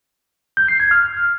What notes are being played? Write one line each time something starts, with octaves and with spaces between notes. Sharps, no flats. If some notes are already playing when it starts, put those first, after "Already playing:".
G6
C7
G#6
F6